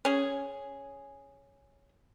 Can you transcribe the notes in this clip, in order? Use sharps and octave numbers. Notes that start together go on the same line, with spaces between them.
C#4 G#4